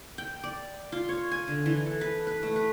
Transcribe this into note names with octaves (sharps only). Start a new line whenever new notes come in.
G5
D5
F4
C#5
G#5
D3
E3
A4
B4
B4
A3
B4